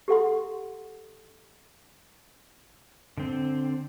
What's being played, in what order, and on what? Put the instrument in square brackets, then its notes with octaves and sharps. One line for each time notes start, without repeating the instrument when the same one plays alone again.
[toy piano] G4 A4 F#5 C6
[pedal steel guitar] D3 C4